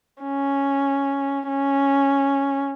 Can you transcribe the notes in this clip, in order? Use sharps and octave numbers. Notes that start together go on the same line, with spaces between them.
C#4
C#4